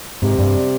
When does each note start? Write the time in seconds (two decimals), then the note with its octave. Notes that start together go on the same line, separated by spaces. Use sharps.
0.22 G#2 C3
0.39 G2